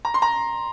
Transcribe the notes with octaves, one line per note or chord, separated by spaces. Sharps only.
A#5
C6
A#5